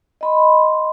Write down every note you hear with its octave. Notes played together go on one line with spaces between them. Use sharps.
D#5 B5 C6